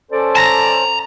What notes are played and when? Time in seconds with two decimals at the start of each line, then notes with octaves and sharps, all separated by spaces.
0.12 C#4 A4 C5 D5
0.35 A5 A#5